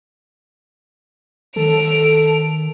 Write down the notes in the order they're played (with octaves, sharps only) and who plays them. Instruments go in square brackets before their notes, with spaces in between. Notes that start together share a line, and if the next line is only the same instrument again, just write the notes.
[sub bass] D#3 [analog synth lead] A4 [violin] D7 F7